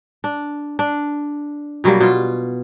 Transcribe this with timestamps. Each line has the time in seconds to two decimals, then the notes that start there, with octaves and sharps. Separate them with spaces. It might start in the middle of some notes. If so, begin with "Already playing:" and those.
0.24 D4
0.79 D4
1.84 B2 F#3 G3 A#3
2.01 B2 F4